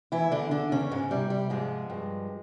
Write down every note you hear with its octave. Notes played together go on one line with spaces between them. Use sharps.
E3 E4
E2 D3 D4
D3 D4
E2 C#3 C#4
G#2 G#3
C3 G3
G3
G#2 F3 G#3
G2